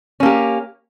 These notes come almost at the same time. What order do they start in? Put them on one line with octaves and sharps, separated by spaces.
C#4 A#3 G4